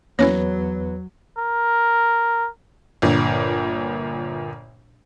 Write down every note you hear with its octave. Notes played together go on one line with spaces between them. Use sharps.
E2 F#3 A#3 C#4 E4 B4 C#5
A#4
G1 A#2